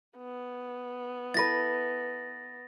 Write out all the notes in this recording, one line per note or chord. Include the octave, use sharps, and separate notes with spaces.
B3
E4 A4 B4 A6 A#6